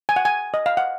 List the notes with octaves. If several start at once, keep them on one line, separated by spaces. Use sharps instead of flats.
G#5
F#5
G#5
D#5
F5
F#5